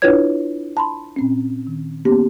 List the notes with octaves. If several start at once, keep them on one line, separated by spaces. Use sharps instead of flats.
D4 E4 F4 B4 C#5 G#6
A5 B5 C6
A#2 C4 C#4
D#3
A#3 B3 C#4 G4